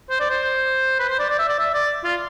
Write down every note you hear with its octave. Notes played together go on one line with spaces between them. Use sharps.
C5
D5
C5
B4
C5
D5
D5
E5
D5
E5
D5
F4